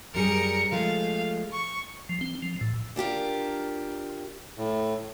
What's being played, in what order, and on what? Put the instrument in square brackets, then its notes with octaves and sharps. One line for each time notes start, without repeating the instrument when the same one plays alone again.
[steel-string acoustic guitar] F#2 G3 G#4 [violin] A#4 C#7
[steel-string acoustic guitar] F3 G#3 A3 [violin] F5
[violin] C#6
[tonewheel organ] F3
C4
F3
A2
[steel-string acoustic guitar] D4 F4 G4 A#4
[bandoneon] A2